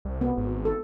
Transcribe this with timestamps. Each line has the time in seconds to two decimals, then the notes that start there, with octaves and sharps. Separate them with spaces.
0.05 C2
0.21 B3
0.37 G#1
0.65 A4